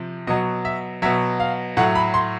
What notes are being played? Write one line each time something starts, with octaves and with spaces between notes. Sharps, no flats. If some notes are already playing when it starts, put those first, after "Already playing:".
Already playing: C3 F3
B2 F#3 D#5
E5
B2 F#3 E5
F5
A2 F#3 F#5
B5
C6